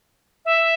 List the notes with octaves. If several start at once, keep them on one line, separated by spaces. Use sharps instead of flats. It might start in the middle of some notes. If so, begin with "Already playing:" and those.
E5